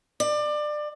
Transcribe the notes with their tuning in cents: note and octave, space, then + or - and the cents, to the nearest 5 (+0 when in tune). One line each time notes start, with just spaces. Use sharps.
D5 +25